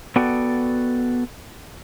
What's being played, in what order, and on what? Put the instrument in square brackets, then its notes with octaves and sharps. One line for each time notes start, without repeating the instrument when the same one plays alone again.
[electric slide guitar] B3 F#4 A4 D5 G5